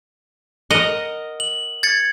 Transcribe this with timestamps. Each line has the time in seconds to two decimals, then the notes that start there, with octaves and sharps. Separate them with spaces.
0.70 A#4 D#5 F#5
1.40 F#7
1.83 G#6 A6 C#7